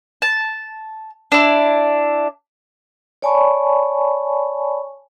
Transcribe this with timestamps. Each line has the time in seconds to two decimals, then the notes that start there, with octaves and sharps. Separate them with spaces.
0.22 A5
1.32 D4 E4
3.22 C#5 D5 G#5 A5 B5 C#6